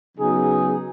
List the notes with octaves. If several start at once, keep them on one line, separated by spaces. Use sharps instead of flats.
C#3 F#3 B3 D#4 G#4